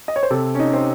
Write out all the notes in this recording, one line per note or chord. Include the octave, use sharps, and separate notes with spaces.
D#5
C#5
C5
C3 A4
C#4
D#4
C4